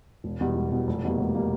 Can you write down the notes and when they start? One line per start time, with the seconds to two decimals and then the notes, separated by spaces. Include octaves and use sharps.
0.24 E1
0.40 E2 B2 G3
0.55 E1
0.72 E2 B2 G3
0.87 F1
1.04 E2 B2 G3 A#3
1.19 F1
1.35 B2 G3 A#3